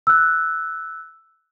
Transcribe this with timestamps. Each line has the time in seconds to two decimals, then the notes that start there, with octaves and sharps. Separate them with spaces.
0.07 E6 F#6